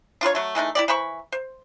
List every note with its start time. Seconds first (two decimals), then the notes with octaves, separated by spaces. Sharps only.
0.21 D4 F4 B4 C#5
0.35 F#3 A3
0.55 E3 G#3 A3 D#4
0.75 E4 G4 D5
0.88 E3 C5 B5 C#6
1.32 C5